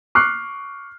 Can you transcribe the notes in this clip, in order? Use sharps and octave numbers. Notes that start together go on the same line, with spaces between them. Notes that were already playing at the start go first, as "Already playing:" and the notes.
C#6 D6 F6 F#6 C7